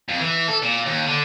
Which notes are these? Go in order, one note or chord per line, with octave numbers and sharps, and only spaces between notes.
F2
E3
A4
A#2
D#2
D3